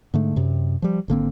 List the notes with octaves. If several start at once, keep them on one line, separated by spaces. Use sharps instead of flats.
G#2 D3 A3
F#2 C3
F3 G3
G#1 D3 A#3 C4